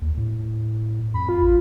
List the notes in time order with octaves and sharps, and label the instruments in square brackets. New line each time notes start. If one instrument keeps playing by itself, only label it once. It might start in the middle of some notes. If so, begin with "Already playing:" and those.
[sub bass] D#2
A2
[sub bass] F2 [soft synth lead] B5
[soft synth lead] F4
[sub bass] A1